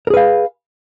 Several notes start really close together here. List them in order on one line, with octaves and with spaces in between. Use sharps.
A#4 G#4 B4 F5